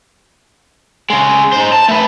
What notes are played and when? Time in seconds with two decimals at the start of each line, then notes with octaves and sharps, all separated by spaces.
1.10 C#3 G#3
1.52 D#4 C5
1.72 A5
1.89 A3 B4